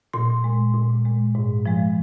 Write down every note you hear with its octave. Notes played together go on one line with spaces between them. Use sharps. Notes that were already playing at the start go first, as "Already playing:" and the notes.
A#2 C6
G#3
A#2
G#3
G#2
F3 G#3